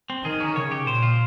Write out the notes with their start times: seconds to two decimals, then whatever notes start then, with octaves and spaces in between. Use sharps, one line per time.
0.10 C4
0.24 D#3 G#4
0.40 C#4
0.56 C#3 C#5
0.71 G4
0.87 A#2 C5
1.03 F4